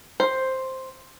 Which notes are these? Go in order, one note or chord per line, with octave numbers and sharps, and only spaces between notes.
C5